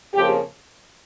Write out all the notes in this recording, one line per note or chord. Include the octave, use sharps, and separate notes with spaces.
F2 C#3 F3 A#3 G4